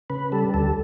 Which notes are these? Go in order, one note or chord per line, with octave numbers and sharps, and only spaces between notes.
C#3 B4
G3 A4
D2 A4